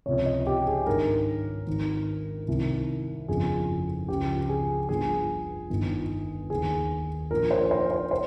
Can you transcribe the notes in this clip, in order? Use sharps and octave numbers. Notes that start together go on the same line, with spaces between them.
C#2 C3 F3 C#5
D#5
G4
G#4
G#1 G2 D#3 A#4
G#1 G#2 D#3
C2 C3 D#3
G1 F2 C#3 F3 G#4
C#2 C#3 F3 G4
G#4
G1 G2 F3 G#4
G1 G2 D#3
D#2 D#3 G#4
A#1 A#2 F3 A#4
C5
C5
C5
C5